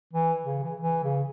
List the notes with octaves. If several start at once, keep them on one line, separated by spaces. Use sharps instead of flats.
E3
C#3
E3
E3
C#3